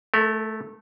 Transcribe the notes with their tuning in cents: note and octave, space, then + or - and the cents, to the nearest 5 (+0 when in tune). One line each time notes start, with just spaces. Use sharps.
A3 -10 A#4 -45